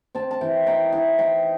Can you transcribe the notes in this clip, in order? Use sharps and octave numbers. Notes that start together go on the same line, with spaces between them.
C4 A5
A5
E3 G5
D#4 G5
E3 F#5
D#4 G5